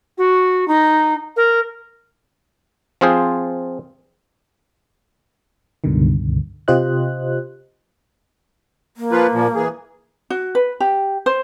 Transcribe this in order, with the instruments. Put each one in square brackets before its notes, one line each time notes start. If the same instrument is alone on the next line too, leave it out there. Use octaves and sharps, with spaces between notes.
[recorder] F#4
D#4
A#4
[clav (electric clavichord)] F3 C4 F4 G#4 C5
[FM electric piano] C#2 G2 B2 D3 D#3
C3 F4 G4 C5 D#5 F#6
[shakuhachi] A#3
[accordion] F3 F4 B4
A#2 F3
E3 G#4
[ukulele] F#4
B4
G4
C5